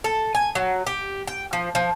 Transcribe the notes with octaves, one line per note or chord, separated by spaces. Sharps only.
A4
G#5
F#3
G4
G5
F3
F3